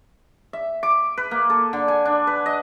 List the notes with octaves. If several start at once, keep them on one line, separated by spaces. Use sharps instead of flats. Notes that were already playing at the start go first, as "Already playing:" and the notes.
E5
D6
B4
A#3
A4
D3
G#5
D4
B4
D#5